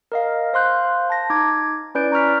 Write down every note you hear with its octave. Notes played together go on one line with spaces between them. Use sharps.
A#4 D#5 F5
C5 F5 C6 F#6 G6
A5 A#6
D#4 D6 G#6
C#4 E4 B4 D5 G6 D7
A#5 C#6 F6 B6